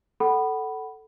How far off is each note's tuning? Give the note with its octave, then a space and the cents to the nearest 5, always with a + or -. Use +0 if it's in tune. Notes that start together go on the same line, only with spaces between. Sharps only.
A4 +0 F#5 +25 B5 +0